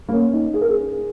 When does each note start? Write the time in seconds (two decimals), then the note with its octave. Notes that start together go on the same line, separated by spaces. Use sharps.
0.09 A#3
0.13 C#4
0.33 D#4
0.54 G#4
0.61 A#4
0.69 G#4